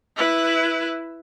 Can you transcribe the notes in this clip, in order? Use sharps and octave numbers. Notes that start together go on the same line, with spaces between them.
E4 B4